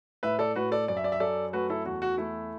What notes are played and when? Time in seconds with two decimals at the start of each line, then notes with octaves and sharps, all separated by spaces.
0.23 A2 B4 E5
0.39 A4 D5
0.56 A2 F#4 B4
0.72 A4 D5
0.88 F#2 D5
0.97 E5
1.04 D5
1.12 E5
1.20 F#2 A4 D5
1.53 A3 F#4 B4
1.70 E4 A4
1.85 E2 F#4
2.02 F#4
2.18 A3 E4